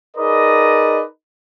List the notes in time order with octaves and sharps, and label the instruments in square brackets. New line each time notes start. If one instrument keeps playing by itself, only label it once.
[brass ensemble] D#4 G#4 A#4 B4 D5 D#5